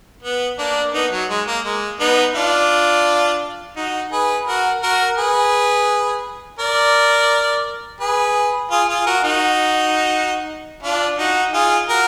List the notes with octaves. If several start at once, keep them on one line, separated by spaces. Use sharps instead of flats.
B3
A#3 D4
B3 D#4
F#3
G#3
A#3
G#3
B3 D#4
D4 F4
D#4 F#4
G#4 B4
F#4 A#4
F#4 A#4
G#4 B4
A#4 D5
G#4 B4
F4 G#4
F4 G#4
F#4 A#4
D#4 F#4
D4 F4
D#4 F#4
F4 G#4
F#4 A#4